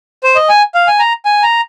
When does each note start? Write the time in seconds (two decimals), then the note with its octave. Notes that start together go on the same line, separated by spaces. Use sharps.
0.24 C5
0.35 D#5
0.49 G#5
0.75 F5
0.88 G#5
0.99 A#5
1.25 G#5
1.43 A#5